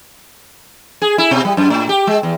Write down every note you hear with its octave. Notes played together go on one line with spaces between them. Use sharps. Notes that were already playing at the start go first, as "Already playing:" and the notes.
G#4
E4
B2
G3
F#2
A2
G4
G#3
E2